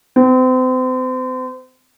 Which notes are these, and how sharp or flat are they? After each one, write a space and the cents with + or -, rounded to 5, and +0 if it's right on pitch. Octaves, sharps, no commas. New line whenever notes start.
C4 -35